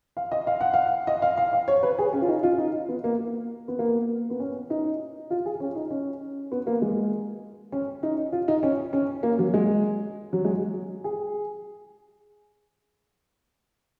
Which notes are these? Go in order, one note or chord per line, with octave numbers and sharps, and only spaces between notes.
F5
D#5
F5
F#5
F5
D#5
F5
F5
F5
C#5
B4
G#4
C#4
F4
D#4
F4
D#4
B3
A#3
B3
A#3
B3
C#4
D#4
F4
G#4
C#4
D#4
C#4
B3
A#3
G#3
C#4
D#4
F4
D#4
C#4
C#4
A#3
F#3
G#3
F#3
G#3
G#4